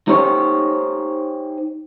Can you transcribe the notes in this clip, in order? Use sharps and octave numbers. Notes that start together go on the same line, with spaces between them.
D#4 G4 C5 C#5